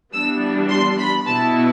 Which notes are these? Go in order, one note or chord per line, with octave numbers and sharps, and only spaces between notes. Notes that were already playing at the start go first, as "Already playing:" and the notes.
E3 G3 B3 D4 E6
C6
B5
B2 B3 E4 A5